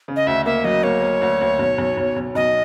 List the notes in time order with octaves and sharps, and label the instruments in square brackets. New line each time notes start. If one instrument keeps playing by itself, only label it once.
[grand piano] C#3
[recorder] D#5
[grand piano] D2 [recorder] E5
[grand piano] A#3 [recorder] E5
[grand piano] F#3 [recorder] D#5
[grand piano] A#3 [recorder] C#5
[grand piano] A#3
D2
D2
B1
B1
B1
B1
[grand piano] B1 [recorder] D#5